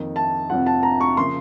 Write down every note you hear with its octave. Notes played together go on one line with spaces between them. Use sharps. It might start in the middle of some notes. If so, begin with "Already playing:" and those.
Already playing: F2 D#3 A#3
A5
F2 C3 F3 C4 F4 F#5
A5
A#5
C#6
C#3 F3 A#3 C6